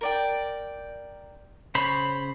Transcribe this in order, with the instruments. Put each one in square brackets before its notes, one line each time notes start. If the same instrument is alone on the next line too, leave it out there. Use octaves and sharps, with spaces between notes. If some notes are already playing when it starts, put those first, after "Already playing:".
[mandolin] A#4 D5 G5
[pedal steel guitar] C#3 C5 B5 [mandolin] C#5